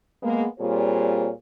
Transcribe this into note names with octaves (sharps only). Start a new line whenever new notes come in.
G#3 A#3 B3
A#2 G3 C4 F4 G#4 C#5